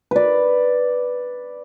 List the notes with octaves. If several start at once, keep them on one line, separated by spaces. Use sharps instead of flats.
B4 D5